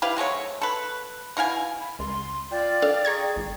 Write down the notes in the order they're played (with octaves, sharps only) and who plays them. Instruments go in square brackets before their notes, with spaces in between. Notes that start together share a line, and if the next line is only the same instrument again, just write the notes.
[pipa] E4 G4 B4 F5
F#3 G#3 A3 C#5
A4 B4
B2 E4 F5 G#5
[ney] B5
[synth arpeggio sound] C#2 [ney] C6
[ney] F4 [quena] D5 [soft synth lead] G5
[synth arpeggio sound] D4 A4 F5
[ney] G#4 [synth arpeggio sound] A#5 C#6 G#6
[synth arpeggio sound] G#1